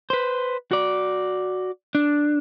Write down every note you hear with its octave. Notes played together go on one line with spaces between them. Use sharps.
B4 C5
F#4 D5
D4